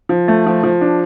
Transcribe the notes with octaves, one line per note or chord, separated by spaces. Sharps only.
F3
A3
F3
F3
D4